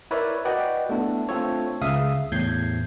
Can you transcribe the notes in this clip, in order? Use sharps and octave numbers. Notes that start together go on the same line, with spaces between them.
E4 A#4 B4 C#5 D5 E5
F#4 B4 D5 D#5 F#5 G5
A3 B3 D4 E4
A3 C4 D4 F4 A4 C#5
C#2 C#3 E5 F5 D#6
E2 A2 G6 G#6 C7